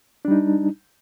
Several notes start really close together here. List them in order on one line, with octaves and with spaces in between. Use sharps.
D4 G3 D#4